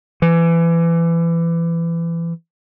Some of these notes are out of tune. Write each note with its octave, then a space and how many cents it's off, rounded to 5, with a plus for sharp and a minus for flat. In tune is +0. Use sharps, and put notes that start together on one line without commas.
E3 +25